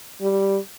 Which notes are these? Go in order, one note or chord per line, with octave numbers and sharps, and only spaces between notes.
G3